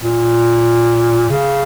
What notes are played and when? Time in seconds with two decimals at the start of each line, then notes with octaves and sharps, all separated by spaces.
0.02 A#2
1.29 C#3